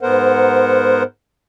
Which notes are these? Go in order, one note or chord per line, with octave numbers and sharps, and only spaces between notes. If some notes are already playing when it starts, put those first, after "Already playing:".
G#2 B3 A#4 C5 F#5